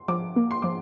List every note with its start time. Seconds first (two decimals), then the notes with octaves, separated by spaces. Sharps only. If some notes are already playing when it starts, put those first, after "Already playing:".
Already playing: C6
0.08 F3 D6
0.36 A#3
0.51 C6
0.62 F3 D6